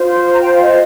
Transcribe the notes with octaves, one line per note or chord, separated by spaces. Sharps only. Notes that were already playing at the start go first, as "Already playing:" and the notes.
Already playing: F4 C5
C6
C6
A#5
G5
F5
D#5